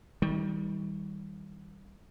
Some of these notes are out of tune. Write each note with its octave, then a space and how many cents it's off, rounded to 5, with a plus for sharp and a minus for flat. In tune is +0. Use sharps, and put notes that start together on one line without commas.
D#3 +45 G3 +5